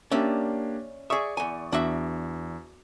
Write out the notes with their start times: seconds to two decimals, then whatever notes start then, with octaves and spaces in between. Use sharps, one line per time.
0.11 A#3 C#4 D4 G4 D5 E5
1.10 G#4 D5 E5 C#6 D#6
1.37 E2 G#5
1.72 E2 D4 F#4 E5